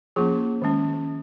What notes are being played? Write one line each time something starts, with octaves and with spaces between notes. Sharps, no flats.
F3 A#3 C#4 F4 G#4
D#3 G#3 C#4